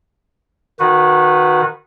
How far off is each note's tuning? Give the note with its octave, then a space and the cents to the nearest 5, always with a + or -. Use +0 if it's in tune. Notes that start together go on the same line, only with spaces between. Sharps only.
D#3 -25 F#4 -25 B4 +0